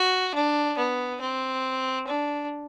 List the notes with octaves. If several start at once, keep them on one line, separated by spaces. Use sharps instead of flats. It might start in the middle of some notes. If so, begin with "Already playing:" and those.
Already playing: F#4
D4
B3
C4
D4